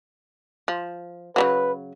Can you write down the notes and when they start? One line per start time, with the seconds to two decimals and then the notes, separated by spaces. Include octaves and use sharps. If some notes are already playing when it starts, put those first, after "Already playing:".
0.68 F3
1.36 C#3 E3 F#3 B4